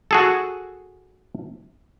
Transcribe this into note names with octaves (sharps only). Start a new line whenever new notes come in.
F#4 G#4 A4